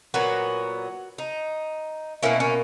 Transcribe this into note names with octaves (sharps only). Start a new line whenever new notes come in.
A#2 F#3 B3 F#4
D#4
B2 A#3 C#4 E4
C#4